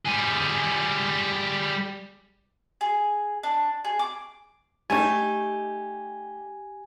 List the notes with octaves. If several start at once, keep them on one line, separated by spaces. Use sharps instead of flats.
G3 G#4
G#4
D4
G#4
D6
A3 D#4 G4 G#5